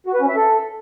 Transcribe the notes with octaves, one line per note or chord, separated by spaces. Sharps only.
F#4
B4
C#4
E5
A4